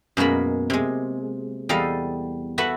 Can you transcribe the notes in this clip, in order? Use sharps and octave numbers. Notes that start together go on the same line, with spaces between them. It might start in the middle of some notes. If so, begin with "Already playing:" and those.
F#2 B2 G#3 A#3 B5
C3 G#3
E2 G3 A4 D#5 F5
F#4 A4 B4 E5 F#5